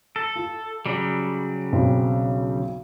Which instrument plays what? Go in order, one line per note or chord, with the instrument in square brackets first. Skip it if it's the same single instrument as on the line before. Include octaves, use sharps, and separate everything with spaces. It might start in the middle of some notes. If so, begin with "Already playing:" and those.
[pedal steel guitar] A4
[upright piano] F4
[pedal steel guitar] C#3 F#3 G3
[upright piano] B1 C4